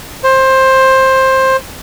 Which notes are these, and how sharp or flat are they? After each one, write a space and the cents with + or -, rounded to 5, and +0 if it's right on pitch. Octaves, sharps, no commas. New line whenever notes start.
C5 +15